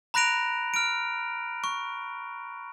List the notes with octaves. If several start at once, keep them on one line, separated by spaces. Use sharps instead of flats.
A#5 B5 F#6 A#6 D7 F7
F6 D7
C#6